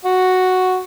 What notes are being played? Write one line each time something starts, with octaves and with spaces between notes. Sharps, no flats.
F#4